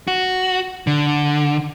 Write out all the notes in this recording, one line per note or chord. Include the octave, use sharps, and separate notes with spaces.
F#4
D3